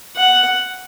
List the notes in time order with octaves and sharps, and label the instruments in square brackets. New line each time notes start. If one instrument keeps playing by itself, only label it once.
[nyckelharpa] F#5